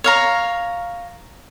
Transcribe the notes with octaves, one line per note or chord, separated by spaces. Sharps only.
C#5 F5 A#5